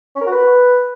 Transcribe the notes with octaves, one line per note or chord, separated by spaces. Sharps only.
C#4
A#4
F#4
B4